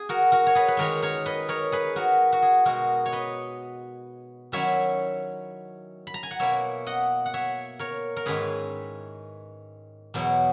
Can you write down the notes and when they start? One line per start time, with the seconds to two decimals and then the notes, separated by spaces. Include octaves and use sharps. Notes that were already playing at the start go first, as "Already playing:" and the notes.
Already playing: G#4
0.09 F#4 A#4
0.32 F#4 A#4
0.47 C#5
0.55 G#4 B4
0.68 B4
0.77 D#3 G#3 D#4 A#4 C#5
1.02 A#4 C#5
1.26 B4 D#5
1.49 A#4 C#5
1.72 G#4 B4
1.96 F#4 A#4
2.32 F#4
2.42 G#4
2.65 B2 G#3 B3 F#4 A#4
3.06 C#5
3.13 B4 D#5
4.52 D#3 F#3 C#4 E4 C#5 E5
6.07 B5
6.14 A#5
6.23 G#5
6.31 F#5
6.40 B2 A#3 E4 C#5 E5
6.87 D#5 F#5
7.26 F#5
7.34 C#5 E5
7.79 A#4 C#5
8.17 A#4
8.26 G#2 D#3 G#3 C#4 E4 G#4 B4
10.14 E2 B2 F#3 B3 E4